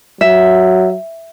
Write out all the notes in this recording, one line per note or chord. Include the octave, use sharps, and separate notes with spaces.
F#3 E5